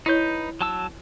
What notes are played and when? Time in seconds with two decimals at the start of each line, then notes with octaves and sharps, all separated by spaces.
0.06 D#4 E4 B4 C#5 D#5 G6
0.61 F#3 A5 E6